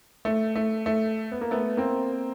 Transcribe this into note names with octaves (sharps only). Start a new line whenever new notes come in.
A3
A3
A3
B3
A#3
A3 B3
A#3 C4